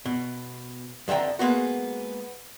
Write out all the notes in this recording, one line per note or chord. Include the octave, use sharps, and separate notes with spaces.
B2
F2 D3 E5 G5 A#5
G#3 A#3 B3 F#4